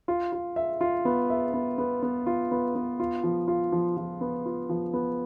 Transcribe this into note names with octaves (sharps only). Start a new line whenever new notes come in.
F4
F4
E5
F4
B3
E5
B3
B3
B3
F4
B3
B3
F4
F3
F4
F3
F3
B3
F4
F3
B3